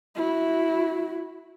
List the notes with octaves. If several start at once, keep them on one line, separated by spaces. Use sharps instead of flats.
E4 F#4